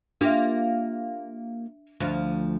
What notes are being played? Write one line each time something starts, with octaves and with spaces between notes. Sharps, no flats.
A#3 D4 F4 G4 E5
D2 F3